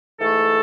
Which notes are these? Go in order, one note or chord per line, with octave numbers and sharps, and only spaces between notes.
G#2 E3 A3 A4